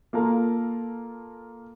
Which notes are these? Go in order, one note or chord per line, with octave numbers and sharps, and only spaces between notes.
A#3 F4 A4 A#4